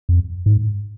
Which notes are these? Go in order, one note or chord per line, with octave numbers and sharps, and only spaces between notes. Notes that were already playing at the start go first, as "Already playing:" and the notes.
F2
G#2